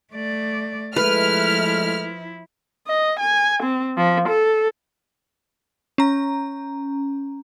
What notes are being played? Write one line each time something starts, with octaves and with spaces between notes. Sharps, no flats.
A3 D5
F3 G#3 A3 E4 B4 F6
D#5
G#5
C4
F3
A4
C#4 A#5